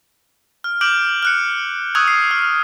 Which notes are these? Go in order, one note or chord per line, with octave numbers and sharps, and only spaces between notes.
F6
D6 F6 G6 D7 F#7
F6 F#6 C#7
C#6 D#6 E6 F#6 G#6
C7
F6